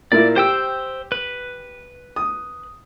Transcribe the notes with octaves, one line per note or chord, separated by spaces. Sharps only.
A#2 A#3 E4 D5
G4 C5 G5 E6
B4
D#6